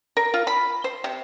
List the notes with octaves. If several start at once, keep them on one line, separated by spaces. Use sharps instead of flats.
A#4
F4
B5
C5
C3